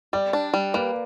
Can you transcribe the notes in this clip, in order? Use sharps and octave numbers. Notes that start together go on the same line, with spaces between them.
G3 D5
D4
G3
A#3 B4